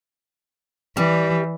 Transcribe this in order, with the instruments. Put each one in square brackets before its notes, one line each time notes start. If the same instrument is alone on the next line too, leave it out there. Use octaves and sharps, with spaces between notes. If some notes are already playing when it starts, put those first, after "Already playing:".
[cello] E3 [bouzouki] G3